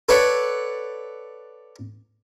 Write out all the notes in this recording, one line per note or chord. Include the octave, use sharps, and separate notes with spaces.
A4 B4 C#5 D5 F#5